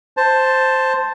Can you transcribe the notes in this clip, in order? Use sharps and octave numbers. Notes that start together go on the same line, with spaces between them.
C5 A5